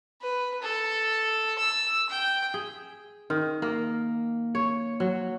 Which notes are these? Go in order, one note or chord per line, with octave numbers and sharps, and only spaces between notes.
B4
A4
E6
G5
G#4
D#3
A#3
C#5
F#3